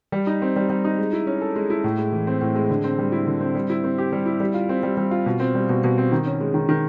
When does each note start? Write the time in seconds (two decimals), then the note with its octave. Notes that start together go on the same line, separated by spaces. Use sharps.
0.12 G3
0.27 D#4
0.42 C4
0.56 G3
0.69 G3
0.84 D#4
0.98 G#3
1.13 E4
1.27 C#4
1.41 A4
1.56 G#3
1.70 E4
1.84 A2
1.98 G#3
2.12 E3
2.27 C4
2.41 A2
2.55 G#3
2.70 D3
2.84 C4
2.98 G3
3.12 E4
3.27 D3
3.41 C4
3.55 G3
3.70 E4
3.84 C4
3.98 G4
4.12 G3
4.26 E4
4.40 G3
4.54 F4
4.69 C4
4.83 G3
4.97 G3
5.11 F4
5.26 B2
5.40 C4
5.55 G3
5.69 B2
5.84 B2
5.98 C4
6.12 D#3
6.26 C#4
6.40 G#3
6.54 D#3
6.69 D#3